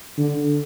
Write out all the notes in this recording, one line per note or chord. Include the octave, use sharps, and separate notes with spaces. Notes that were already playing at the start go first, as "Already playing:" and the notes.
D3